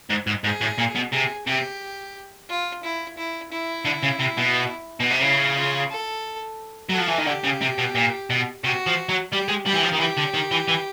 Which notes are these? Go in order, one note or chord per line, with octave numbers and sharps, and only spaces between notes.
G#2
G#2
G#2 G#4
A2
A#2
B2
C3 G#4
C3 G4
F4
E4
E4
E4
D3
C#3
C3
B2
B2
C3
C#3 E4
F4
A4
F#3 A4
F3
E3
D#3
D3 G4
C#3
C3
B2
A#2
B2
C3 F#4
F3
F#3
G3 G4
G#3
G3 G4
E3
F3
D#3
E3 G4
D3
D#3
E3
E3